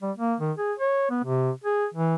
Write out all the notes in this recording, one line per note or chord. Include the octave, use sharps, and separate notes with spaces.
G3
A#3
D#3
G#4
C#5
B3
C3
G#4
E3